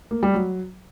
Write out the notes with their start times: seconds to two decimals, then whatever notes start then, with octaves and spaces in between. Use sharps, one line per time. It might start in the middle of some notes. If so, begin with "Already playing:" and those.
0.11 A#3
0.23 G3
0.35 F#3